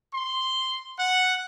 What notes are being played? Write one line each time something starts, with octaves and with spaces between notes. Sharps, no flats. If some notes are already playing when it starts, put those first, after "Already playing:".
C6
F#5